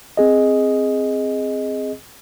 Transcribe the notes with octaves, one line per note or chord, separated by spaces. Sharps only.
C4 G#4 D#5